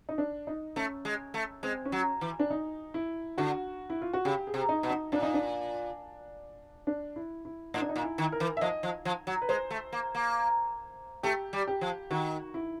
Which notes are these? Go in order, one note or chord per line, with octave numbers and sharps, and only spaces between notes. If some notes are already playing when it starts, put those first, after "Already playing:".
D#4
D4
D#4
A3 C#4
G#3
A3
G#3 C4
C#4
F#3
E3
D4
D#4
E4
D3 F#4
E4
F4
F#4
C#3 G4
G#4
C3
D#4
B2
D#4
A#2 D4
D#4
D4
D4
E4
E4
A2 D#4
D4
D#4
A#2
E4
D#3
A#4
E3
E5
F3 D#5
F3
F3
F#3
B4
G#3 C5
A3
A#3
A#3
A3 G4
G3
G4
F3
D#3 F#4
E4